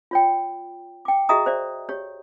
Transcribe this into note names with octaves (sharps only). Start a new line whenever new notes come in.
F4 C#5 G5
G5 D6
F#4 G#4 D#5 E5 A#5 D#6
C5 D5 E5
G4 C#5